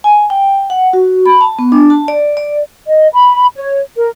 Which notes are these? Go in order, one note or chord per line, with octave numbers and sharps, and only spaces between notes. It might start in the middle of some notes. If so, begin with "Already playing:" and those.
G#5
G5
F#5
F#4
B5
A5
B3
D4
A5
D5
D5
D#5
B5
C#5
A#4